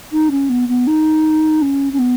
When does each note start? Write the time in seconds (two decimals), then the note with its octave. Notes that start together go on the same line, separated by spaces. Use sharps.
0.12 D#4
0.31 C#4
0.49 B3
0.68 B3
0.87 D#4
1.61 C#4
1.93 C#4
1.99 B3